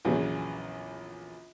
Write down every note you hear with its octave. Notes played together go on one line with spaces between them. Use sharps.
A#1 E2 C#3 F#3